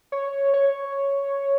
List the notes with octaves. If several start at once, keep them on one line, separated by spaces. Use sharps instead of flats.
C#5
C#5